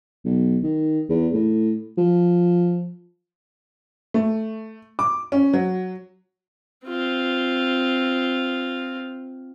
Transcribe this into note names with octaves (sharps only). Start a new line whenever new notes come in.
B1
D#3
E2
A2
F3
A3
D6
C#4
F#3
C4 F4